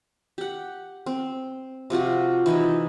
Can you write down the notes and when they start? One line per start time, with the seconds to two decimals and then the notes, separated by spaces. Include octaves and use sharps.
0.38 G4 F#5
1.06 C4
1.90 C3 F3 F4 F#4
2.46 E3 D#4 E4 D#5